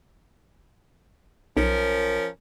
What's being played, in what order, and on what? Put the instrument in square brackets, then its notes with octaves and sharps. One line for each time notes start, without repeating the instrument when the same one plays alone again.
[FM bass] B1 [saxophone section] F3 C#4 A#4